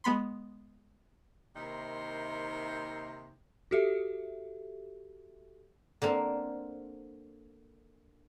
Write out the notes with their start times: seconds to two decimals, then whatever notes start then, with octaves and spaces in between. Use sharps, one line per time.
0.04 G#3 B3 B5 C6
1.56 C3 D#3 A#3 D#4 E4 C5
3.71 F#4 G4 A4 E5 F5
6.02 D3 A#3 C4